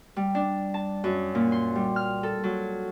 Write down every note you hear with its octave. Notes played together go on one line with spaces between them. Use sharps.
G3
D4
A5
F#2
A#2
C6
G3
F6
A4
F#3